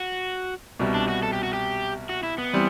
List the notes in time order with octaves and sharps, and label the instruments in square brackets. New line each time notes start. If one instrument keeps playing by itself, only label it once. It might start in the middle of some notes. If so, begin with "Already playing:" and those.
Already playing: [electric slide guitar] F#4
[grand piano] C2 B2 G3
[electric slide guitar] D4
F#4
A4
G4
F#4
G4
F#4
E4
B3
[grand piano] E3 G3 C4